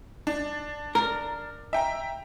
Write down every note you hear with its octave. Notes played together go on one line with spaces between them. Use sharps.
D4
A#4
E5 G5 A#5